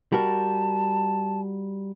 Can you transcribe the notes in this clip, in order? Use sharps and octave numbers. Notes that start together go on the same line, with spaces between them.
G3 F#4 A#4 A5